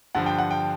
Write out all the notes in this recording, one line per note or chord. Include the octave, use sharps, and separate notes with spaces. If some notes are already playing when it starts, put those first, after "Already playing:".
G2 D3 F3 F#5
G5
F#5
G5